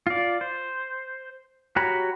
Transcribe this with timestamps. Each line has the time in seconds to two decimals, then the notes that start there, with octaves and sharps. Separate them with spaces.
0.07 F4 D5
0.41 C5
1.76 F#4 G4 C#5 A#5 B5